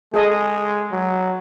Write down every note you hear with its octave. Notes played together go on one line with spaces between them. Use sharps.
G#3 G#4 A4 D#5
F#3